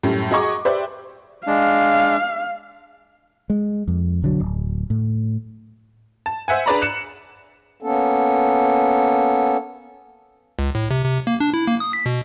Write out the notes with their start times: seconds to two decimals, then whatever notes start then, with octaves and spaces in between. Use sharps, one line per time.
0.03 F#2 A2 G3 C#4
0.31 F#4 G#4 D#5 A#5 C#6 D6
0.65 G4 B4 C5 D5 E5 G5
1.47 G#3 D4 F5
3.50 G#3
3.88 F2
4.22 B1 D3 F#3
4.40 D1
4.90 A2
6.26 A5
6.48 C5 E5 F#5 G#5
6.66 D4 G#4 B4 D5 A#5 B5
6.82 F#6 C#7 E7
7.82 A#3 B3 C#4 A4
10.59 C#2
10.75 A2
10.91 C3
11.04 C3
11.27 A#3
11.40 D4
11.54 E4
11.68 A#3
11.80 D#6
11.93 B6
12.06 B2